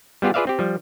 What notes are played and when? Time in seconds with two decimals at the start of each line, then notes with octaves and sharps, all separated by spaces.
0.22 G3 B3 F4 G4 G#4
0.34 F4 G#4 B4 D5 E5 F5
0.47 C4 G4
0.59 F3 G3